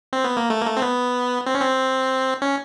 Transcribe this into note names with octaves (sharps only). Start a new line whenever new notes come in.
C4
B3
A#3
A3
A#3
A3
C4
B3
C4
C#4
C4
C#4